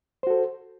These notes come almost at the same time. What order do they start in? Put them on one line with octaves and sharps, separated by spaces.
C5 F#4 A4